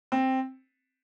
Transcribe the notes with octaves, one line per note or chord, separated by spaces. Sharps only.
C4